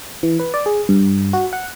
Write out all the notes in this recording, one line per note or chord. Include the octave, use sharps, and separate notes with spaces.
E3
B4
D5
G#4
G2
F#4
F#5